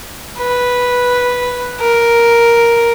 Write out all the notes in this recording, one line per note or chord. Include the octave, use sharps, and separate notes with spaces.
B4
A#4